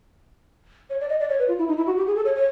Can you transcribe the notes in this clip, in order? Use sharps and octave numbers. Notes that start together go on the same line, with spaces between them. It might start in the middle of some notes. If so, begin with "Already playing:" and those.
C#5
D5
D#5
D5
C#5
B4
F4
E4
D#4
E4
F#4
G4
G#4
A4
C#5
C#5